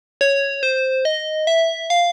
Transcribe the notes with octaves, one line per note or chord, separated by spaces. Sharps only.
C#5
C5
D#5
E5
F5